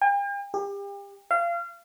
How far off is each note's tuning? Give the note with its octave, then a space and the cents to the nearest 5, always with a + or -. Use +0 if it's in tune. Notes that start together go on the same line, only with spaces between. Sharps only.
G5 +45
G4 +35
F5 -30